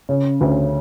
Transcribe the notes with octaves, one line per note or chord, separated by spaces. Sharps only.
C#3
D2